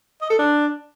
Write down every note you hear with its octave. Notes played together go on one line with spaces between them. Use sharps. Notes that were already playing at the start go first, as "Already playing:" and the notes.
D#5
A4
D4